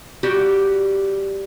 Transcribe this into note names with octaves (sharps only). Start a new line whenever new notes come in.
G3 F#4 G4